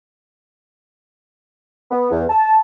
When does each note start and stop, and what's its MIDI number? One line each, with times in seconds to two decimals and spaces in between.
1.91 2.08 59
2.11 2.24 40
2.30 2.59 81